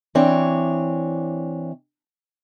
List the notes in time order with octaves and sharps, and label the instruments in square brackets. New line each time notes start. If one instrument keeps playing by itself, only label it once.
[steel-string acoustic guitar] E3 C4 D4 C#5